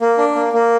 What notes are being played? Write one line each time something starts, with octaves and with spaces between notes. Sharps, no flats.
A#3
D4
A#3
A#3